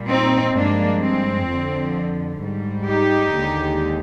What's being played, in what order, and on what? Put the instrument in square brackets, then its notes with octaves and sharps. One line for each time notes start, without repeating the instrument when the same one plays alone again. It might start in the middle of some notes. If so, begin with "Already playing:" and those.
Already playing: [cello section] A#2 G3
C4 D#4
G2 F3 G#3 A#3 D4
C4
F2 D3 F3
G#2 G3
D#4 G4
D#2 D3 G#3